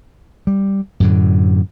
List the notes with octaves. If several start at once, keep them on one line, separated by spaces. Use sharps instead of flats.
G3
F#2 A2 D3